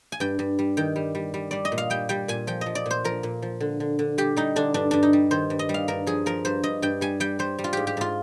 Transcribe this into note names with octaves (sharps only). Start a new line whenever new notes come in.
G#5
G2 G5
G2
G3
D#3 G5
G3
G3
G3
G3 D5
D#5
A#2
F5
G3 G5
G3 G5
A#2 G#5
F3 G5
D#5
F3
D5
A#2 C5
F3 A#4
A#2
F3
D3
D3
D3
G3 G4
G3 D#4
D3 D4
G2 D4
G2 D4
D#4
G3
D#3 C5
G2
D#5
G3
F5
G2 A#4
F3 G#4
F3 A#4
G2 C5
G2 D#5
G2 G5
G3 G#5
G3 G5
G3 C5
G3
F4
G#2 G4
G4
G#2 F4